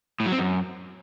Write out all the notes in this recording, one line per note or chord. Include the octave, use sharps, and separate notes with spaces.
A2
F#3
C4
F#2